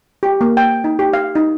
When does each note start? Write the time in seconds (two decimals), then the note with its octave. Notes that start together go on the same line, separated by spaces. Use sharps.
0.23 G4
0.41 A#3
0.57 G5
0.84 D#4
0.99 G4
1.13 F5
1.35 D#4